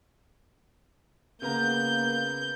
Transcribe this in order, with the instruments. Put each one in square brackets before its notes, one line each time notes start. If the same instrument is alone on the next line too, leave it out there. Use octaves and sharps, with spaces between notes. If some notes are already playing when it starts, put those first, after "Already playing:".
[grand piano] C#3 B3 A#5 [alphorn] A#3 [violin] G6